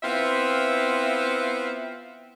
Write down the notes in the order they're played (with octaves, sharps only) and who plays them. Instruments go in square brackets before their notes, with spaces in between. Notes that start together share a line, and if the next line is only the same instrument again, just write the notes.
[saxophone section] B3 C4 E4 F4 E5 F5